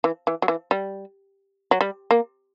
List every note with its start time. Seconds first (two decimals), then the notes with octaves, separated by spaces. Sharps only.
0.04 E3
0.27 E3
0.42 F#3
0.48 E3
0.71 G3
1.71 F#3
1.81 G3
2.11 A#3